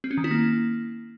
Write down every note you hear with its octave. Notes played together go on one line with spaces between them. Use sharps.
C4
C#4
D#3
E4
A#3